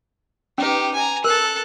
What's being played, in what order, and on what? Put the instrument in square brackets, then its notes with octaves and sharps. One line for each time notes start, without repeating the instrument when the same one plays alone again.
[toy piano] C#4 B4 [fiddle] D#4 G4
[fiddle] G#5 A#5
[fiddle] A4 F#6 [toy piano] A#4